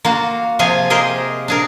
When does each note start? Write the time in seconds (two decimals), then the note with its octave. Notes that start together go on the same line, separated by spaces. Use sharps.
0.05 A#3 F4 F#4
0.59 C3 F3 F4 G#4 G#5
0.90 G4 G#4 A#4 C5 D#5
1.48 D4 G#4 A#4